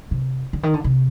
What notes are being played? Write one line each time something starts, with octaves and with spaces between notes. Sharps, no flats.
C3
D3
D#3
D3
C3